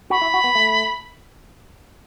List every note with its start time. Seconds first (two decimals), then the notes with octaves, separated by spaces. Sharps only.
0.10 F#4 B5
0.21 E4
0.34 F#4
0.44 B3
0.55 A3